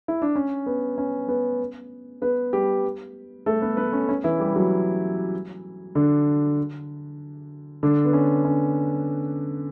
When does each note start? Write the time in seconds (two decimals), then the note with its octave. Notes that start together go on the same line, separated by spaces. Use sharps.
0.08 E4
0.22 D4
0.35 C#4
0.66 B3
0.98 C#4
1.28 B3
2.22 B3 B4
2.53 G3 G4
3.46 A3 A4
3.61 B3 B4
3.77 B3 B4
3.93 C#4
4.09 C#4
4.24 E3 E4
4.40 G3 G4
4.56 F#3 F#4
5.95 D3 D4
7.83 D3 D4
8.05 B3
8.13 C#4
8.45 C#4